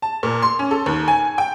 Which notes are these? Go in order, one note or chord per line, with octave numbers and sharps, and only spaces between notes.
A5
A#2
C6
C#4
A4
D#2
G#5
G5